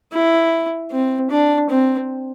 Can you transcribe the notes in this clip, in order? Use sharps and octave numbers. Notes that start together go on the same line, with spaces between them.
E4
C4
D4
C4